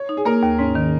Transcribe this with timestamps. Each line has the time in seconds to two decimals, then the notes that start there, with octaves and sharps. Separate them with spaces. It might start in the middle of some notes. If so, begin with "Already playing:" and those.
Already playing: C#5
0.09 D#4
0.17 G#4
0.25 A#3 A#4
0.43 D#2
0.59 G#2 C#4
0.75 D#3